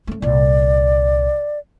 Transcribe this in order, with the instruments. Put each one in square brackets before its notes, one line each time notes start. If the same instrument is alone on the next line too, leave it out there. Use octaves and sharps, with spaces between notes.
[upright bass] A3 C#4
[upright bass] C2 A#2 [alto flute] D5